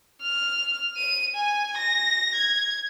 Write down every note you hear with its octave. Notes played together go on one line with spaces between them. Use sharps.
F6
D#7
G#5
A#6
G#6